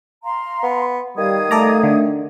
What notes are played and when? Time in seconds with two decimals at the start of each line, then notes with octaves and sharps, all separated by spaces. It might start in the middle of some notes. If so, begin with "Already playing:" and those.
0.24 F5 A#5 C6
0.63 B3
1.18 D#3 G3 F5 D#6 G#6
1.51 A3 A4 D5 A#5
1.83 D3